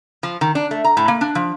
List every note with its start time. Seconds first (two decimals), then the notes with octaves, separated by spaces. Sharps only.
0.23 F3
0.41 D#3
0.55 D4
0.71 A3
0.84 A#5
0.97 A2
1.08 A#3
1.21 D4
1.35 F3